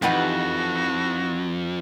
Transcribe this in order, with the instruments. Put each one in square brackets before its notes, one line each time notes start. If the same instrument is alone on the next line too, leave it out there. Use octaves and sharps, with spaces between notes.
[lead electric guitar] F2 [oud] E3 D#4 G4 [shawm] F#4 [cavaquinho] B4 F#5 A5